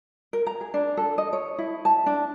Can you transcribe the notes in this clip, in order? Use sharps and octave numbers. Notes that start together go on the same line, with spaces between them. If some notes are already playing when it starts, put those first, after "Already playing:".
A#4
A#5
G#4
D4
A4
D#5
C#5
E4
A5
D4